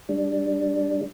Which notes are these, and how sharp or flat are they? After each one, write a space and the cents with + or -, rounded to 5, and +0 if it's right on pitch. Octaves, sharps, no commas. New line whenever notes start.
G3 +0 D4 +0